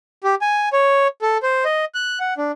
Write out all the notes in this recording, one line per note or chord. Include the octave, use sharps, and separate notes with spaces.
G4
G#5
C#5
A4
C5
D#5
F#6
F#5
D4